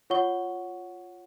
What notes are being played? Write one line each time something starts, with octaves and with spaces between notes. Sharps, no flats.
F4 C#5 F#5 C#6 G7